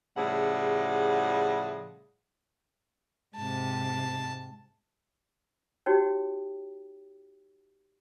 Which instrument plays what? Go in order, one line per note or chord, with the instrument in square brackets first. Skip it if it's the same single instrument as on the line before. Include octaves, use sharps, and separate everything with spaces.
[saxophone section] A2 C#3 F3 G3 G#4 F#5
[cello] G#2 C3 [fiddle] A5
[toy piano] D#4 F#4 G4 C#5 G5